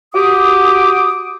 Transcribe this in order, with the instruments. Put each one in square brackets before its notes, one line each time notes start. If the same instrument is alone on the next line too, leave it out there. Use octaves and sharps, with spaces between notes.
[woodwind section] F#4 G4 D6 D#6